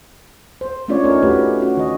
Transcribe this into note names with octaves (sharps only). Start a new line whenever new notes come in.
C5
A3 C#4 D4 F4 C#5 D5
C#4 D#4 F4 A#4 C#5
A3 C#4 F#4 G4 B4
C#4 F#4
D#3 D#5